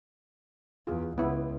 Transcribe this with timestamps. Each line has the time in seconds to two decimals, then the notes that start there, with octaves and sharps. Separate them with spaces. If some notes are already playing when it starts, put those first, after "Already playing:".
0.87 E2 F4 G#4
1.18 C#2 B3 E4